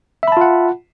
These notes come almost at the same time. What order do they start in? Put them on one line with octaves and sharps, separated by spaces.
E5 B5 A5 F4 F#5